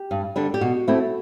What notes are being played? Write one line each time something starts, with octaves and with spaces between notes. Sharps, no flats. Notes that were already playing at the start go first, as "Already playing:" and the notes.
Already playing: G4
G2
D3 G3 D4
G4
B2 F#4
A3 C4 E4